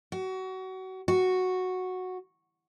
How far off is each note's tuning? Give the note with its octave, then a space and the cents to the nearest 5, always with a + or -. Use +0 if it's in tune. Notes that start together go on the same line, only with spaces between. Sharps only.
F#4 +25
F#4 -5